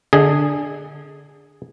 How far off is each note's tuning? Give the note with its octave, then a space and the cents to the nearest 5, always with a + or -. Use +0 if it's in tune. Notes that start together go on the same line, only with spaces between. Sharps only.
D3 +0 G#4 -10 D#5 +30